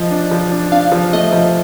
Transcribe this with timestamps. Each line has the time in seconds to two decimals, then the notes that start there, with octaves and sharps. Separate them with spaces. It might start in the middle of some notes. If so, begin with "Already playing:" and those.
Already playing: F3 D#5
0.11 D4
0.31 F3
0.51 D4
0.72 D4 F5
0.92 F3
1.13 A3 D#5
1.32 F3